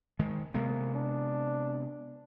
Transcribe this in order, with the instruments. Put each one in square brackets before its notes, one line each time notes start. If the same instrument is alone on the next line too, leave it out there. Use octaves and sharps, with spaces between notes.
[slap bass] D#3 G#3
[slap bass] C3 G#3 B3 [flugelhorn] A#3
[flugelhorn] D4